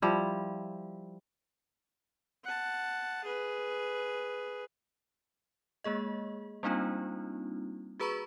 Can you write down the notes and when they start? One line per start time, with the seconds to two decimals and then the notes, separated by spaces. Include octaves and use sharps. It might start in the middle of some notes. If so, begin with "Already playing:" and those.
0.02 F3 G3 E4
2.44 F#5 A5
3.24 G#4 B4
5.84 G#3 A#3 G#4 D#5
6.63 G3 A#3 C4 D4 D#4 F4
8.00 F#4 G#4 B4 A#5 B5 C#6